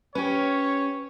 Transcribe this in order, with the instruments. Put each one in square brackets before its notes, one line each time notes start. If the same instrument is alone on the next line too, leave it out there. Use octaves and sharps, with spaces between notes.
[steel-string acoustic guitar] C#4 G4 [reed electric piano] B4 [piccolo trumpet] C#5